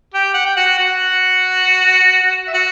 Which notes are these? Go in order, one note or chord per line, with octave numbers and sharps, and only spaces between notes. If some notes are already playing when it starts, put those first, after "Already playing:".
G4 G5
F#5
G5
F#4 F#5
F#4 F#5
E5
F#4 F#5